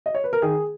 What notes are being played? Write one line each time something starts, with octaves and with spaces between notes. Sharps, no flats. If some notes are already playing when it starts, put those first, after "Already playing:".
D#5
C#5
B4
A#4
D#3 G#4